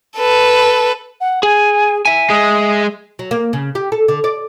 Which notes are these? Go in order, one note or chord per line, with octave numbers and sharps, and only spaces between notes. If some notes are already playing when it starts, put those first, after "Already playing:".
A4 B4
F#5
G#4 G#5
E5 G#5
G#3 D#6
F#3
A#3
C#3
G4
A4
D3
D5